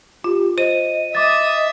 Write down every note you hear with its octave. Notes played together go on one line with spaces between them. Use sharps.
F4 G4
C5 D#5 D#7
D#5 E5 D6 D#6 A6